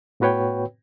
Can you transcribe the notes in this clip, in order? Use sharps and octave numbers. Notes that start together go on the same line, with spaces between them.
A2 B3 F#4 B4 C#5 G5